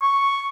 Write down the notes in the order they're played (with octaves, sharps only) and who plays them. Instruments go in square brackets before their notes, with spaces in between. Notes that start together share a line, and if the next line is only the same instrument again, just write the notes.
[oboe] C#6